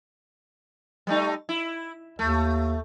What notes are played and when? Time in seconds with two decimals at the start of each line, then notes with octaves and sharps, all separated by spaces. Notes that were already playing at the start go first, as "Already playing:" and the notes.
1.07 G3 A3 D#4
1.49 E4
2.19 D#2 A3